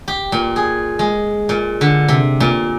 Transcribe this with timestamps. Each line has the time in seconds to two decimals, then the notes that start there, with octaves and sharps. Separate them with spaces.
0.08 G4
0.32 A#2
0.56 G#4
0.99 G#3
1.49 A#2
1.81 D3
2.08 C3
2.40 A#2